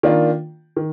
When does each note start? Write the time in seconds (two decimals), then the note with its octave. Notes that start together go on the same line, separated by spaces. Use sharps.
0.03 D#3 A#3 D4 F4
0.77 D#3